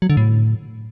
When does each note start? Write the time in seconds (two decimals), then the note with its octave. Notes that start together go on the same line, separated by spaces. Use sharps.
0.02 F#3
0.10 D3
0.17 A2